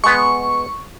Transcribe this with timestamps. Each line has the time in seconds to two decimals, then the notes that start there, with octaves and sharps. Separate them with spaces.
0.04 G#3 B3 C#6